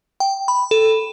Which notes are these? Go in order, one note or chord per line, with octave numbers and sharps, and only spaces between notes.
G5
B5
A4